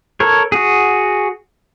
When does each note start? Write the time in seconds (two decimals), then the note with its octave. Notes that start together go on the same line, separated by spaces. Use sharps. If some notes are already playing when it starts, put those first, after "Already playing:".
0.20 A4 A#4 C#5
0.52 F#4 G#4